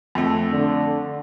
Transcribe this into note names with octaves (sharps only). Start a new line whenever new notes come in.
F2 A3
D3